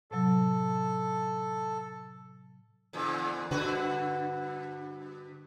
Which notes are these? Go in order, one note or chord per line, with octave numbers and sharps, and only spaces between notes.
A2 C3 F#3 A4
E2 A#2 D3
G2 D3 F#4 B4